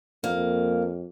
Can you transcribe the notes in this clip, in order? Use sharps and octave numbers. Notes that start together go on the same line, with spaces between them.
F2 A#3